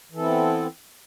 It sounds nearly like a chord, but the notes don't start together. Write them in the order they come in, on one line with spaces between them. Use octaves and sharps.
E3 A4 C4 E4 B3